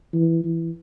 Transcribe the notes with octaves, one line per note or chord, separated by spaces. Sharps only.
E3
E3